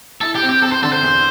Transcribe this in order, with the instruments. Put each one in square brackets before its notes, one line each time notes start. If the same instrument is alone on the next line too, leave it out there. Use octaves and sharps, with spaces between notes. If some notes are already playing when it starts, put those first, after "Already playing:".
[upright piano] E4 [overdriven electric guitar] A4
[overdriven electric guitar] G4
[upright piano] C4
[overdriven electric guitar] G4
[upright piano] C4 [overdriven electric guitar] A4
[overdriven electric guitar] C5
[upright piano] D3 [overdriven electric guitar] A4
[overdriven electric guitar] C5
[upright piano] E2